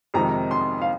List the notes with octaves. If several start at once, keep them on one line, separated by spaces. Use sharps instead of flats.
F2 C3 D#3 G#3 D#4 A#5
C6
F5